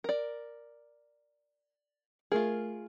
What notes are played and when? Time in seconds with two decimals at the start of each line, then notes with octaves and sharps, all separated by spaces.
0.04 A#4 D5
2.32 A3 F4 G#4 A#4